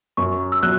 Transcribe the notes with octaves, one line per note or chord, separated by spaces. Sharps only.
F#2 C#6
E6
F#3 F#6